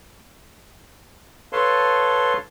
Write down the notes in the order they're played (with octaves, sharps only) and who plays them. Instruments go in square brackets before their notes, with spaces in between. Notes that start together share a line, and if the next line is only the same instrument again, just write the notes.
[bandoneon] A4 B4 C#5 F5 A5 C6